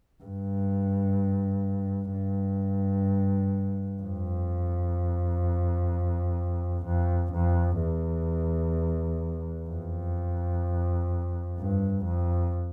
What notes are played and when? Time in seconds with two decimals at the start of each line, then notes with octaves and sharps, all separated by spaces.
0.24 G2
2.12 G2
4.02 F2
6.86 F2
7.32 F2
7.79 E2
9.69 F2
11.59 G2
12.05 F2